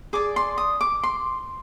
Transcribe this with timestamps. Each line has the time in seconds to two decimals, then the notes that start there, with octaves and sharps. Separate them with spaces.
0.13 G#4 D5 D6
0.36 C6
0.58 D#6
0.81 D6
1.03 C6